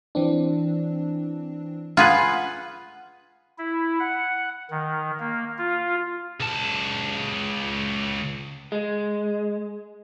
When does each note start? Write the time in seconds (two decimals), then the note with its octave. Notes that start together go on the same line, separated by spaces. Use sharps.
0.15 E3 C4 D4
1.97 F4 G#4 B4 F#5
3.58 E4
3.99 F#5
4.71 D#3
5.20 A#3
5.58 F4
6.40 C#2 A5
8.72 G#3